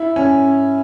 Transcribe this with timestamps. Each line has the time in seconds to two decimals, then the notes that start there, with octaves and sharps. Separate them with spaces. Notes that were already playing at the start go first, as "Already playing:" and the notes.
Already playing: E4
0.16 C#4